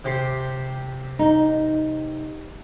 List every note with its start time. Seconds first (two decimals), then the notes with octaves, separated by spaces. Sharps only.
0.04 C3 G4 C6
1.19 D#4